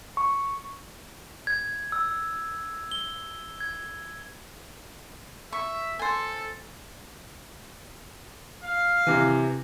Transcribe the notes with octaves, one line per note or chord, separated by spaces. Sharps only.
C#6
G#6
E6
G7
G#6
E5 C#6
A4 C5 G#5
F5
C3 E3